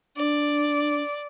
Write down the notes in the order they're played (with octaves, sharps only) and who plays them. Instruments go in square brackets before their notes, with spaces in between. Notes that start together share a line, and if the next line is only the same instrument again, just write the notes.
[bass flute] D4 [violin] D5